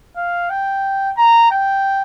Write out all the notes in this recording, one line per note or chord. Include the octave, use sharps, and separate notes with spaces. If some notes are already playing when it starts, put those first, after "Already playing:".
F5
G5
A#5
G5